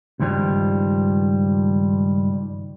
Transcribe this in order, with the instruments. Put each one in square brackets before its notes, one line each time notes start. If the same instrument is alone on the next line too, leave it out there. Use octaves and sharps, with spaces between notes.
[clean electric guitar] C#2 G2 D#3 F3 G3